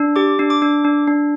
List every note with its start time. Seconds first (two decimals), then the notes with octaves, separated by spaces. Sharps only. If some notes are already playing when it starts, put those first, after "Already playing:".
Already playing: D4
0.16 G4 D6
0.39 D4
0.50 D6
0.62 D4
0.84 D4
1.08 D4